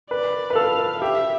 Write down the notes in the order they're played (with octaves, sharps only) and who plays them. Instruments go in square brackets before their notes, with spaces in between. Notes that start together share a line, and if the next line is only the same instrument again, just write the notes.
[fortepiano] B4 [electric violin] D5
[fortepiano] B4
[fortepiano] A4 [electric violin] F5
[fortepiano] G4 [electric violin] E5